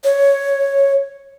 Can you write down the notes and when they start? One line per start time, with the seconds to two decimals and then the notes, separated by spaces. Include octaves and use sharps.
0.04 C#5